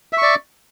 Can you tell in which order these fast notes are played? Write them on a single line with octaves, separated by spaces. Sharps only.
E5 C#6 D5